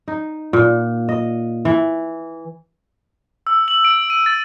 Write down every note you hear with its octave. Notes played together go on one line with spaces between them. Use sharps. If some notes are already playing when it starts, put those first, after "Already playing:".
D#4
A#2
D#5
E3
E6
F#7
D7
D#7
A6